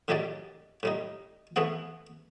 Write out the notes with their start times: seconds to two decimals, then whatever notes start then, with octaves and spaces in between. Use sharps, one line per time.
0.08 F#2 A2 D#4 G4 G#4 D5
0.83 A2 G3 D#4
1.56 E3 A3 B3 G#4 F#5